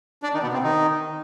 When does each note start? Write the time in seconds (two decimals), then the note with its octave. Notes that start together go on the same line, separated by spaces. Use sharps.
0.23 D4 D5
0.34 D#3 D#4
0.43 B2 B3
0.52 C3 C4
0.63 D#3 D#4